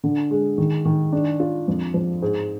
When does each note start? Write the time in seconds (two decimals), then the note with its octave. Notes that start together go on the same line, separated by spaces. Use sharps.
0.04 D3
0.31 G#3
0.58 D#3
0.85 D#3
1.12 D4
1.40 F4
1.68 F2
1.94 F3
2.22 G#2